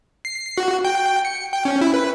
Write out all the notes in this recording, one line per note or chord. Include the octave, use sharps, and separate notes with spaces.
C7
F#4
G5
C#7
G5
C#4
E4
B4